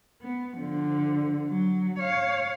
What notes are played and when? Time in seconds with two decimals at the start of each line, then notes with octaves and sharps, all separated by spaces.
0.22 B3
0.58 D3 F3
1.49 F#3
1.98 C#5 F5